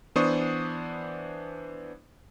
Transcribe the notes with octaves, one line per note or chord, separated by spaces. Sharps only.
E3 B3 D4 C5 C#6 D#6